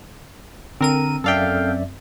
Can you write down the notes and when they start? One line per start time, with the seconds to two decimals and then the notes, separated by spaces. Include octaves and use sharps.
0.81 D3 C4 A#4 D#7
1.24 F#2 A4 D5 E5 F5 G5